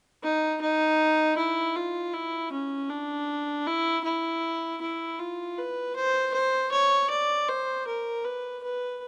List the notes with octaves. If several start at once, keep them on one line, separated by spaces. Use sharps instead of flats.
D#4
D#4
E4
F4
E4
C#4
D4
E4
E4
E4
F4
B4
C5
C5
C#5
D5
C5
A#4
B4
B4